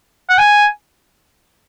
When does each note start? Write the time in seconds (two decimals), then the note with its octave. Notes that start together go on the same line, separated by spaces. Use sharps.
0.30 F#5
0.38 G#5